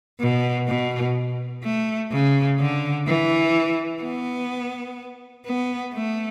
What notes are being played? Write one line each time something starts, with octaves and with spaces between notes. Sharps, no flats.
B2
B2
A3
C#3
D3
E3
B3
B3
A3